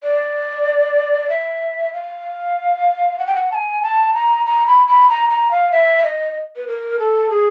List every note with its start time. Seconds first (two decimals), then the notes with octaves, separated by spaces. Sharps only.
0.03 D5
1.29 E5
1.93 F5
3.19 F#5
3.27 G5
3.35 F#5
3.52 A5
3.55 G#5
3.83 A5
4.14 A#5
4.46 A#5
4.67 B5
4.87 B5
5.09 A#5
5.30 A#5
5.51 F5
5.72 E5
6.04 D#5
6.56 B4
6.68 A#4
6.99 A4
7.30 G#4